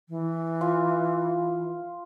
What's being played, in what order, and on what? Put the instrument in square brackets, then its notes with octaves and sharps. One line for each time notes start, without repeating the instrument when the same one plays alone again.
[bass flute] E3
[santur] F4 G#5